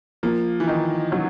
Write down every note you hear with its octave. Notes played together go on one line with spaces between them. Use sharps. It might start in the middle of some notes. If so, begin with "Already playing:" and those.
F3 A#3
E3
D#3 D#4
F#3